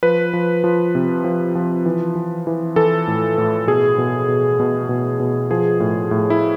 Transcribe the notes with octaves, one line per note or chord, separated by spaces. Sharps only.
F3 B4
F3
F3
C3
F3
F3
E3
E3
E3
E3 A4
A2
A2
B2 G#4
B2
B2
B2
B2
B2
F3 G#4
A2
A2
E4